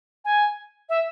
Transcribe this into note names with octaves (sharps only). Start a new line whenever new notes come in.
G#5
E5